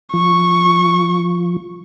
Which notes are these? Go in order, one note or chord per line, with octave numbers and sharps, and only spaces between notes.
F3 C#6